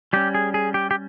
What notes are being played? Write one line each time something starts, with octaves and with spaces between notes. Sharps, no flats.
G3 C#4 G4
G#4
G#4
G4
G4